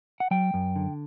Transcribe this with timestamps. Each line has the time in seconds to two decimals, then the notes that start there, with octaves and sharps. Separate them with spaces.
0.20 F#5
0.31 F#3 G5
0.54 F#2
0.76 D3